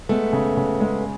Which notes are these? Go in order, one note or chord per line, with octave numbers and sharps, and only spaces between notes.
G#3 A3 B3
C#3
C#3
G#3